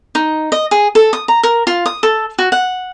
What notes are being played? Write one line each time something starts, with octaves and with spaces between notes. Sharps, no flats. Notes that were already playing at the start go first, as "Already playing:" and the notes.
D#4
D#5
G#4
A4
D#6
A#5
A#4
F4
D#6
A4
F#4
F#5